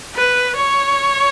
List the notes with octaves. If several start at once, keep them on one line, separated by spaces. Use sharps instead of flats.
B4
C#5